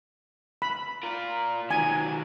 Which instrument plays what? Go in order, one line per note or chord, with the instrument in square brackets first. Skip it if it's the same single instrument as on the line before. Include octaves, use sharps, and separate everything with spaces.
[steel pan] B5
[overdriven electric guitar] F4 A#4
[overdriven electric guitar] D#3 F#3 [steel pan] G#5